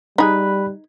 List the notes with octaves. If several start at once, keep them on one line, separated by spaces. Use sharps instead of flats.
G3 D#4 G#4 B5 F#6